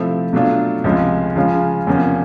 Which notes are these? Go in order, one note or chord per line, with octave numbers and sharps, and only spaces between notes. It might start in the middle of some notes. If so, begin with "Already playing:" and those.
Already playing: C3 F3 A3 C4 E4
B2 F#3 A3 D4 F4
C#2 C3 F3 G#3 C#4
C#3 F3 G#3 C#4 F4
E2 C3 F3 A#3 C#4